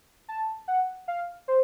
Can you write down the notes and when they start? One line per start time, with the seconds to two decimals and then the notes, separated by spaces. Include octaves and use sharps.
0.28 A5
0.68 F#5
1.08 F5
1.48 C5